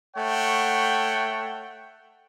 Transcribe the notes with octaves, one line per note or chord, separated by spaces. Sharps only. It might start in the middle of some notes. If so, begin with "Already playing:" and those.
A3 C#5 F#5 G5